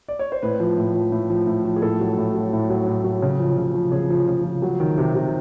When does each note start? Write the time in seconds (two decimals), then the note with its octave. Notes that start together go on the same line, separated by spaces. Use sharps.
0.08 D5
0.19 C#5
0.32 C5
0.43 A2 B4
0.60 F3
0.78 A2
0.94 F3
1.12 A2
1.30 F3
1.47 A2
1.65 F3
1.76 G#4
1.82 A2 A4
2.00 F#3
2.17 A2
2.35 F#3
2.53 A2
2.70 F#3
2.88 A2
3.04 F#3
3.22 C#3
3.39 F3
3.57 C#3
3.74 F3
3.92 C#3 G#4
4.10 F3
4.28 C#3
4.44 F3
4.62 F#3
4.80 D#3
4.98 C3
5.15 C3